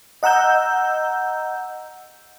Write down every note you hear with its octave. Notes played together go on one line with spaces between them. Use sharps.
D#5 F#5 A#5 E6 G6